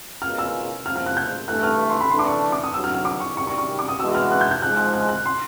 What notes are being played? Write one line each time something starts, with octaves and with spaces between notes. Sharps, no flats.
B2 G#3 C#4 F4 A#4 F6
E6
C#2 C3 F3 A#3 F6
F6
F#6
G6
G2 E3 A3 F#6
F6
C6
B5
E3 A3 D4 C6
D6
C#6
D6
D#6
G2 D3 F#3 E6
F6
F6
D6
C#6
F#2 D#3 G3 C#6
C#6
C#6
D6
D#6
E3 G#3 B3 D4 F#4 E6
F6
F#6
G6
G6
G#2 F3 G#3 F#6
F#6
F#6
F#6
C6